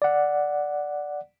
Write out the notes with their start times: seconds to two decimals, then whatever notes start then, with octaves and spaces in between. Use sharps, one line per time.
0.02 D5 F#5